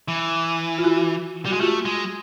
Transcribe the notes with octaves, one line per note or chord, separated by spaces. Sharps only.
E3
F4
E4 F#4
G3
G#3 F#4
A3 F4 G4
G#3